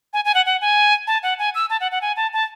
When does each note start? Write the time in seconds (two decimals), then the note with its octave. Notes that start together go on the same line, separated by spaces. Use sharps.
0.13 G#5
0.25 G#5
0.35 F#5
0.46 F#5
0.61 G#5
1.07 A5
1.23 F#5
1.39 G#5
1.55 E6
1.70 A5
1.80 F#5
1.92 F#5
2.01 G#5
2.17 A5
2.33 A5